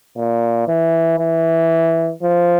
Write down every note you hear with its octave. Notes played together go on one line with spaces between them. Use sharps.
A#2
E3
E3
F3